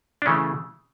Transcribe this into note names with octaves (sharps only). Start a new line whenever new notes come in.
D4
C#3 E3 A3 C#4